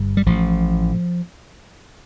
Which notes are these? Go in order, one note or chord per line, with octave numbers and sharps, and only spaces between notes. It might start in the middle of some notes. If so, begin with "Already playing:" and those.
Already playing: G1 G2
G3
A1 A2 F3